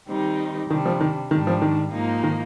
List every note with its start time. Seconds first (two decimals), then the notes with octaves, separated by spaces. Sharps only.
0.09 D#3 G3 C4 D#4
0.70 C3 D#3 G3 D4
0.86 F3
1.01 D#3
1.31 G#2 D#3 G3 D4
1.47 F3
1.62 D#3
1.92 G#2 F3 A#3 D#4
2.24 D#3